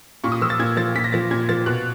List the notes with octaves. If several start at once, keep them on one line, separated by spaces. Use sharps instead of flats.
A#2 C#6
D#6
F3 E6
A6
A#2 G#6
F3 A6
A#2 B6
A#6
F3 A6
A#2 G#6
F3 A6
B2 F#6